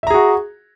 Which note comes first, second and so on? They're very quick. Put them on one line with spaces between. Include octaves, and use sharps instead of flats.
E5 A#5 G#4 F#4